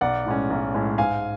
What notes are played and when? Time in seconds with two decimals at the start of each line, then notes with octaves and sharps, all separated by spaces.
0.01 B1 D5 F#5
0.26 A2 G#3 C#4
0.50 B1
0.74 A2 G#3 C#4
0.98 G#2 F5 G#5